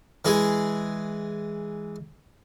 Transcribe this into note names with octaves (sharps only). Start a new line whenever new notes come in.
E3 G#3 G#4